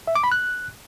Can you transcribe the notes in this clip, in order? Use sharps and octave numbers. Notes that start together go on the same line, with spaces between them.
E5
D6
B5
F#6